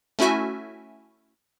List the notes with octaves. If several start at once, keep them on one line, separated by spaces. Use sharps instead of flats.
A3 C#4 E4 F#4 E5 G#5